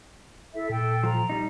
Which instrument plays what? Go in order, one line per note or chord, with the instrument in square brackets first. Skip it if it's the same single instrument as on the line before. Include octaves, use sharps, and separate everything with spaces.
[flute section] E4 A4 E5
[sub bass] A#2 [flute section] A4 G5
[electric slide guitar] F3 [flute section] A#5
[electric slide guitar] G3 D#4